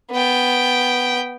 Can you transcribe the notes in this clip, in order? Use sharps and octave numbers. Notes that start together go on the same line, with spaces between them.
B3 G5